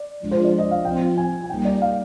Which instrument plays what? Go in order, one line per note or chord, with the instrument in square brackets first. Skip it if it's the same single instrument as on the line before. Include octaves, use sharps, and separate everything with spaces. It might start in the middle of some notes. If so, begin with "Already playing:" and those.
Already playing: [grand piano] D5
[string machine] F3 G#3 D4 F4
[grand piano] C5
D5
D#5
F5
[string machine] F3 C4 F4 [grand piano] G5
[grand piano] G#5
G#5
[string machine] G3 A#3 D#4 [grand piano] G5
[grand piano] D5
F5